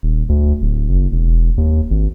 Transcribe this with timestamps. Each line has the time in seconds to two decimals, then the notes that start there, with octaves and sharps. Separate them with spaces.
0.03 D#1
0.29 D2
0.62 D1
0.89 F#1
1.12 E1
1.58 D#2
1.91 G#1